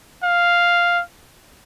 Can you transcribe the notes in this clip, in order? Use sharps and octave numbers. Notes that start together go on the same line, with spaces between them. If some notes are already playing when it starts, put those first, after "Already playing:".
F5